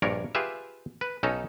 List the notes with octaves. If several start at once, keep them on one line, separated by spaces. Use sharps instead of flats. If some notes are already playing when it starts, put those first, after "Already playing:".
A#1 G2 D4 A#4 C#5 D5
F4 G4 G#4 B4 E5
B4
B1 C#4 D#4 A4 C#5